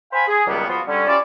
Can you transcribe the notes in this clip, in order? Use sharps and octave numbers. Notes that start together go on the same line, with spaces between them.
C5 F5 G5 G#5 B5
G#4
C#2 D#3 F#3 G3 A#3 B3
F3 B3 F4 F#4
D3 G3 C#4
C#4 E4 F4 G4 D5